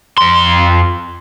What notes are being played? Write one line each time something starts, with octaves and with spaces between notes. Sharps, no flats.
F2 C6